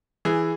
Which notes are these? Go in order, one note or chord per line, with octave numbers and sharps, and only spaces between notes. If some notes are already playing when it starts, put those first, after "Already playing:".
E3 G#4